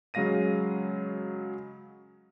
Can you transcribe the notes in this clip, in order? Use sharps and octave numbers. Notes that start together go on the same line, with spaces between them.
C#3 F#3 G#3 F5 A#6 D#7